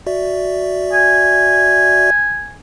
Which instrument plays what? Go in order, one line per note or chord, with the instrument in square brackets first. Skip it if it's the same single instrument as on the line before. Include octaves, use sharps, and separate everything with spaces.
[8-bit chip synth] F#4 D5 E5
[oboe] G#5